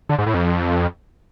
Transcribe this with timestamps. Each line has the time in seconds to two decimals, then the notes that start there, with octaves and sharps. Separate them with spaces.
0.09 D3
0.18 G#2
0.26 A2
0.34 F2